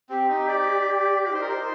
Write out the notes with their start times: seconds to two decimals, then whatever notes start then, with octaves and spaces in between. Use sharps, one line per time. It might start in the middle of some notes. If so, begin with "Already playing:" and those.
0.10 C4 G4
0.29 D#4
0.48 D5
1.25 F4 D5
1.30 D#4 C5
1.41 A#4
1.48 C5